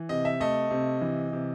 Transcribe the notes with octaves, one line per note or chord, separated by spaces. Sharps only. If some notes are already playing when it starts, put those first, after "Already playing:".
Already playing: E3
C3 D#5
E5
A3 D#5
C3
E3
C3